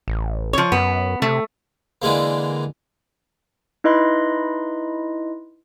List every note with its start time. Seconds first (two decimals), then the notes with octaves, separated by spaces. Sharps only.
0.08 A1
0.53 F3 C#5
0.72 F#2 B3
1.22 C3 A3
2.02 D3 E3 G#3 A#3
3.84 D#4 E4 B4 D#5 B5 C6